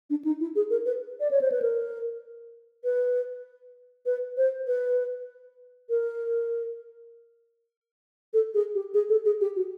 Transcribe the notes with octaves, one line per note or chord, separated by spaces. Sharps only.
D4
D#4
E4
G#4
A#4
B4
D5
C#5
C5
B4
A#4
B4
B4
C5
B4
A#4
A4
G#4
G4
G#4
A4
G#4
G4
F#4